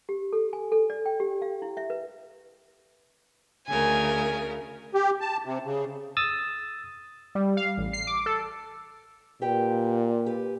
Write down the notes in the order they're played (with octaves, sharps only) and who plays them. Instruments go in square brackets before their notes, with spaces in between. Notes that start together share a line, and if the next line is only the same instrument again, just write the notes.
[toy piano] G4
A4
G#5
A4
D5
G5
G4
F5
E4
E5
B4
[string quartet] D2 C#3 A#4 [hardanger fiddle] G#5
[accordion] G4
A5
C3
C#3
[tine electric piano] D#6 E6 A6
[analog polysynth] G3
F5
A1
C7
D6
A4
[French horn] A#2 [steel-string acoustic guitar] G4 B4 G5
[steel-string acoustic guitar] G4 B4